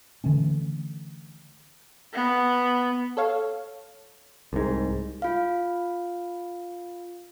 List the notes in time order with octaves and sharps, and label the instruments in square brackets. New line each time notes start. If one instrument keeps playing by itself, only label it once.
[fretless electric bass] D3 E3 A3 C#4
[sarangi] B3
[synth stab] A4 C#5 F5
[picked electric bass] C2 G#2
[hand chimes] F4 F5